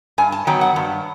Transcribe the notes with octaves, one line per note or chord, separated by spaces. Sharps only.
G2 G#5
A5
D#3 F#3 B3 G5
F#5
G2